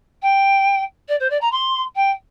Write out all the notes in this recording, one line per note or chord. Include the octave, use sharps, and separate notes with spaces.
G5
D5
C5
D5
A#5
C6
G5